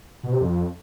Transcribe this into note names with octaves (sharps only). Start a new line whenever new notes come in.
B2
C3
F2